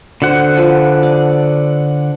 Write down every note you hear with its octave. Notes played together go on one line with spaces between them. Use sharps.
D3 F#4 C5 F#5
F3 B4
D4 D5